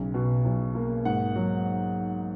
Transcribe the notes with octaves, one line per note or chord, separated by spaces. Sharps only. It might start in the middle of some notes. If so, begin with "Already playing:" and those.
Already playing: B1 C#3
B2
B1
A#3
G#2 F#5
F#3